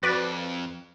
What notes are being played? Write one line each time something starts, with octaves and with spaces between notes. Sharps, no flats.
F2 F#4 B4 D5